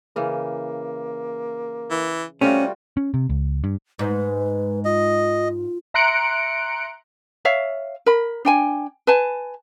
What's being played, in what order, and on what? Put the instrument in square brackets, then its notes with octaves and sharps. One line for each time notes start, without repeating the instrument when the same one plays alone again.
[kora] C#3 E3 [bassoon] A#3
[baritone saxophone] E3
[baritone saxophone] C3 [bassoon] G3 [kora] A3 F4 F#4 [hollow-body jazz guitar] C#4
[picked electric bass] C#4
C3
C#2
G2
[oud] G#2 [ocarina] B4
[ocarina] F4 [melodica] D#5
[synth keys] E5 A#5 C6 F#6 C#7 D7
[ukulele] C#5 E5 F5
A#4 B5
D4 G5 G#5
B4 G#5 A5